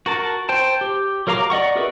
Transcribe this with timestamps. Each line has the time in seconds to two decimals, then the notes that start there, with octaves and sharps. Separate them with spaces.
0.06 F#4 A#4 A5
0.49 C5 G5 A5
0.81 G4
1.27 F#3 A#4 F5 A#5 D6
1.50 D5 D#5 F#5 C#6
1.76 F#4 G#4 A#4 B4 E5